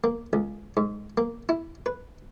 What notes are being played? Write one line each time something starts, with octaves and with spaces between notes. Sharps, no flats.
A#3
C#2
G#2
A#3
E4
B4